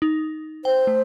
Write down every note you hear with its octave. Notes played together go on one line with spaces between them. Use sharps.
D#4
C5 G5
A3